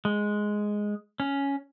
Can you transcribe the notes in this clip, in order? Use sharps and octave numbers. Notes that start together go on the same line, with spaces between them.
G#3
C#4